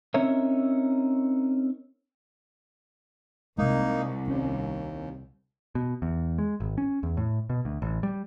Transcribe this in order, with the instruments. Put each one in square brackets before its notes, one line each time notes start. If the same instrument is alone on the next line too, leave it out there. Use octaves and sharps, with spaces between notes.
[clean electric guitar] C4 C#4 D#4 A#4 C#5 E5
[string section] C2 [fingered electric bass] C3 G#3 [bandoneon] A#3 D#4
[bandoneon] D#2 [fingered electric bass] C#4
[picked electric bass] B2
E2
G#3
G#1
C#4
E2
A2
B2
D2
A1
G3